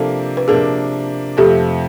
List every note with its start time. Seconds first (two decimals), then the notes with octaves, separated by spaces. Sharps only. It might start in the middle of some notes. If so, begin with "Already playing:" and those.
Already playing: C3 F3 A#3 D4 A4
0.37 B4
0.48 C3 F3 A#3 D4 G#4 A#4
1.37 F2 C3 F3 A3 G4 A4